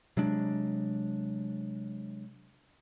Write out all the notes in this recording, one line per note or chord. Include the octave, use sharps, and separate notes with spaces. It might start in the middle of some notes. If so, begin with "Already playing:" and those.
C3 F#3 G#3 D4